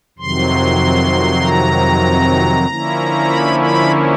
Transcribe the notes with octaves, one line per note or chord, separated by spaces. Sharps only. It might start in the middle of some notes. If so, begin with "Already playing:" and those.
F2 C3 D#3 F#3 C6
A#5
D3 F3 A#3 C#4 E4
B5
B5